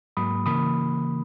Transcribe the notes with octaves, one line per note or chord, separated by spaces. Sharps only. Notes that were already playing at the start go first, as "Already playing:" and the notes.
G#2 F#3 A#3 B5 D#6
C#3 E3 A#3 B5 D#6